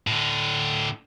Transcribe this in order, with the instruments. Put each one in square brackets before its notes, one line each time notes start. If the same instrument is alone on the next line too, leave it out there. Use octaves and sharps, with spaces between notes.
[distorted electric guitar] A2 D3